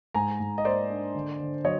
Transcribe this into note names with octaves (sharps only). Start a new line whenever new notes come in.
G#2 G#5 A#5
G#2
D#5
A#3 C5 D5
D4
D3
D3
F#3 C#5 D#5